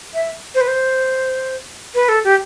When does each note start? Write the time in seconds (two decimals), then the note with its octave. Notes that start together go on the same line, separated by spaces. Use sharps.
0.14 E5
0.55 C5
0.61 B4
0.68 C5
1.95 B4
2.09 A4
2.24 G4